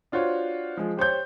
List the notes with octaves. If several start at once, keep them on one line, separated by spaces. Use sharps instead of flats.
D4 F4 F#4 C5 C#5
F3 G#3
G4 C5 C#5 G6